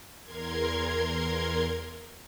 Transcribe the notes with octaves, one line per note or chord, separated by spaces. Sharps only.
E2 A#4 C6 G#6